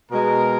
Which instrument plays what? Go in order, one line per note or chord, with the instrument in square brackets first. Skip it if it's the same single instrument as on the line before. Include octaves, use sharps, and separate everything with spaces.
[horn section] B2 G#3 A#4